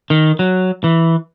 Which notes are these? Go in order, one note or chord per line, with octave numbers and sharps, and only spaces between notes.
D#3
F#3
E3